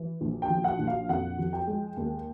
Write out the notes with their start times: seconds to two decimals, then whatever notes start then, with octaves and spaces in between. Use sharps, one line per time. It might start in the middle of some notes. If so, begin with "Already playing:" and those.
Already playing: E3
0.21 A#1
0.42 G5
0.49 F3
0.64 F#5
0.79 A#1
0.87 F5
1.09 F2 F#5
1.38 F3
1.53 G5
1.67 G#3
1.97 D#2